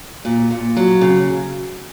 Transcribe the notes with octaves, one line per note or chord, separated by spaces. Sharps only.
A#2
A#2
F#3
C#3